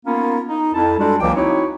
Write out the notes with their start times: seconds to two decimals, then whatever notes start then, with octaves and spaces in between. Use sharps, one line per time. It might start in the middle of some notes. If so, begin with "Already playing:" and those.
0.06 A#3 B3 C#4 D#4 F4 A#4
0.49 D#4
0.74 F2 E4 A5
0.98 G3 G#3 D4 F4 F#4 A4
1.20 C#2 E3 F#3 A#3 G5 D6
1.35 C4 D#4 E4 F#4 C#5